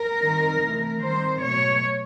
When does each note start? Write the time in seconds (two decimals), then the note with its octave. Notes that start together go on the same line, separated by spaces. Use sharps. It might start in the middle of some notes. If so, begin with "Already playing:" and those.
Already playing: A#4
0.20 D#3 G3 C4 D#4
0.60 C3 E3 A3
1.00 D#3 G3 C4 C5
1.40 B2 F#3 A3 C#5